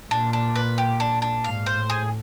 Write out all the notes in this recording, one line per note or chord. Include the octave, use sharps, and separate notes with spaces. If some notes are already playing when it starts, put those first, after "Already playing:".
A#2 D4
D4
B4
G4
D4
D4
G#2 F5
C5
A2
G#4